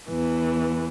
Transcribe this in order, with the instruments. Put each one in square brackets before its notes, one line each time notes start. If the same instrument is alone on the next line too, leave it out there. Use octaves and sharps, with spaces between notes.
[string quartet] E2 E3